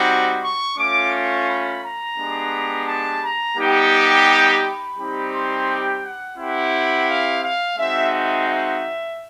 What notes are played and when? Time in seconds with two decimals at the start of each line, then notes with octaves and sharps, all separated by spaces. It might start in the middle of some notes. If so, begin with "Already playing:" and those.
Already playing: G3 C4 D#4 F#4
0.42 C#6
0.77 A3 C#4 F4 D6
1.12 C#6
1.47 B5
1.83 A#5
2.17 G#3 B3 D4 G4
2.87 A5
3.22 A#5
3.57 G3 B3 D#4 G4
4.62 B5
4.97 G3 C4 D#4 G4
5.32 C6
5.67 G5
6.02 F#5
6.36 C4 E4 G4 F#5
7.08 F5
7.42 F5
7.77 G#3 C4 D#4 F#4 E5
8.11 E5
8.47 E5